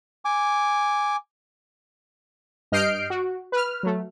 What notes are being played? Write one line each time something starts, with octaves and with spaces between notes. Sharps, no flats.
G#5 D6
G2 D#5 F6 G6 C7 D7
F#4
B4 F6
F#3 A3